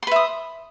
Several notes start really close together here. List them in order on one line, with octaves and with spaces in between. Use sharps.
C6 B4 E5 D#6